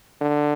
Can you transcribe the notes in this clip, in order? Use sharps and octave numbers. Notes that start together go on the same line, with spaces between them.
D3